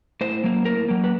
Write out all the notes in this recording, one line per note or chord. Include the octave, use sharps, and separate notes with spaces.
A2 C5
F#3 A#3
A2 A#4
F#3 A#3
B4